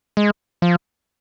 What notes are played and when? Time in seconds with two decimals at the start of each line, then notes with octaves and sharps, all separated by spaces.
0.17 G#3
0.62 F3